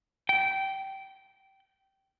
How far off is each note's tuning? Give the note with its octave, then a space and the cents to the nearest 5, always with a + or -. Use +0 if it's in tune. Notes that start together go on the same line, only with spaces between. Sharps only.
G5 -15